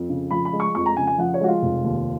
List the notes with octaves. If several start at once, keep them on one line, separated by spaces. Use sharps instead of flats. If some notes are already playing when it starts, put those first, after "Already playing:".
Already playing: F2
C#3
F3 B5
B5
G#3
C#6
F2 C#6
A#5
C#3 G#5
G#5
F3 F#5
C#5
G#3 F#4
F4
F1
D#2